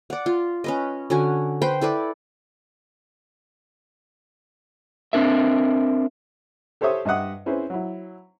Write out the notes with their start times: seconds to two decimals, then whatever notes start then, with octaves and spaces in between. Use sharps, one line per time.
0.10 D5 F#5
0.26 F4
0.64 C#4 B4 D#5
1.10 D3 C#4 F#4 G#5
1.62 B4 C5 G5
1.81 E4 A4 B4 D5
5.13 C4 D4 A#4 E5
6.81 G4 A4 C5 C#5 E5 D#6
7.05 G2 D#5 E5 F#5 D#6
7.46 C4 C#4 E4 G#4 B4 C5
7.70 F#3 E4